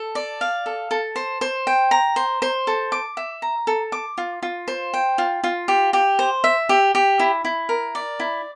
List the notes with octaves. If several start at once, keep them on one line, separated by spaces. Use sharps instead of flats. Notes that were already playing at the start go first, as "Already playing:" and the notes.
Already playing: A4
D5
F5
A4
A4
C5
C5
G5
A#5
C5
C5
A4
D6
E5
A#5
A4
D6
F4
F4
C5
G5
F4
F4
G4
G4
C5
E5
G4
G4
E4
E4
A#4
D5
E4